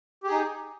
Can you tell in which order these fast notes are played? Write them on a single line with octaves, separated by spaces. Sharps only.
G4 G#4 D#4